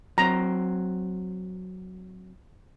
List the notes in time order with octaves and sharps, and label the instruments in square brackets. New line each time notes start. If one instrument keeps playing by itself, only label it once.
[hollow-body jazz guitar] F#3 C4 [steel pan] A#5